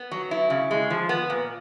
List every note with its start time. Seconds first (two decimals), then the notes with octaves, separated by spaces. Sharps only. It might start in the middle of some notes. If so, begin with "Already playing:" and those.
Already playing: B3
0.11 F#3
0.31 E4
0.50 C#3
0.71 G#3
0.90 F3
1.09 B3
1.30 A#2